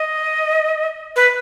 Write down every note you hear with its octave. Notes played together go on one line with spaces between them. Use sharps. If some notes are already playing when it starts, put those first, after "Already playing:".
Already playing: D#5
B4